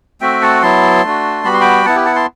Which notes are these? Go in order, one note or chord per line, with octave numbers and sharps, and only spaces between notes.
A3 C4 F#4 E5 G5
F#5 A5
F#3 B3 E4 A5 C6
A3 D4 F#4
G3 B3 F#4 B5
C6
G5 B5
B3 E4 F#5 A5
G4 B4
F#5 A5
A5 C6